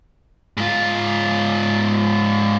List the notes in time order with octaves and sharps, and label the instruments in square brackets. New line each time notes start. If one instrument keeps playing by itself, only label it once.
[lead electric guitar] G#2 F4